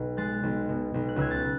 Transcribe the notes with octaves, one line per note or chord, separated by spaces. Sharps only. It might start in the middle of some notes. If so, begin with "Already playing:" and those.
Already playing: B1 B2
G#3 F#6 A6
B1
B2
B1
F#6
C#2 E6 G#6
F#6 A6